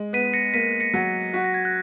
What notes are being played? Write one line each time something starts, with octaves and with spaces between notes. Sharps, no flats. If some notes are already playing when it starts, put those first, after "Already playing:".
Already playing: G#3
B3 B6 D#7
A#6 C#7
A#3 B6 D#7
A#6 C#7
F#3
F#4 B6
A#6
G#6
F#6 A#6